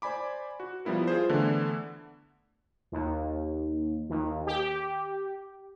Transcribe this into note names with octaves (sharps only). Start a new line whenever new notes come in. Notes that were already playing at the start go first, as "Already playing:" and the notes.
C5 D5 G#5 B5 D6
F#4
F3 G3 B3 E4 A#4
F4 G#4 C5
D3 E3 A3 B3 D4 E4
D#2
D#2
G4